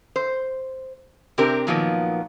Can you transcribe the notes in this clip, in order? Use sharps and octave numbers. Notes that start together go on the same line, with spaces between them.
C5
C3 C4 D4 G4 A#4
A#2 D#3 F3 F#3 A#3 B3